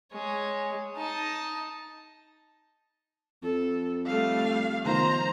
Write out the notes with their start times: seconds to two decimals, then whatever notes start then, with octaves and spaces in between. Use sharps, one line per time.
0.13 G#3 C#5
0.96 D#4 A5
3.43 F2 A4
4.06 G3 A3 F5
4.85 D#3 F3 B3 C5 A#5